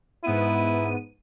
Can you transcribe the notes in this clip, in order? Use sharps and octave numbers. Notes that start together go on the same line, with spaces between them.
G#2 B3 E4 D#7